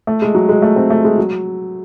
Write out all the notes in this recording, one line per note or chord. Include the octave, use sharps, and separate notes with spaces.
A3
G#3
F#3
G#3
A3
C4
A3
G#3
F#3